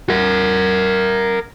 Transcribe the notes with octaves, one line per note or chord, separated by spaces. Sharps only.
A#4 F#5